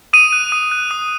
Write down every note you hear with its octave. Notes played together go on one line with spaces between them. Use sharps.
D#6 D#7
F#6
D#6
F#6
D#6